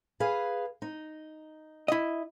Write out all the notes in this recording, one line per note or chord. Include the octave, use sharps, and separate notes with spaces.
G#4 B4 F5
D#4
E4 D#5